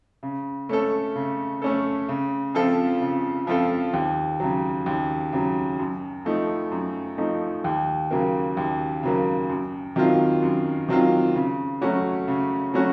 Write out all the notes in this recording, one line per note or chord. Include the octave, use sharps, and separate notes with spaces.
C#3
A3 C#4 A4
C#3
A3 C#4 A4
C#3
F3 C4 F4 A4
C#3
F3 C4 F4 A4
D#2
C#3 F#3
D#2
C#3 F#3
F#2
F3 A3 D#4
F#2
F3 A3 D#4
D#2
C#3 F#3 A#3
D#2
C#3 F#3 A#3
F#2
D#3 F#3 C4 F4
F#2
D#3 F#3 C4 F4
C#3
F#3 A3 C#4 F#4
C#3
F#3 A3 C#4 F#4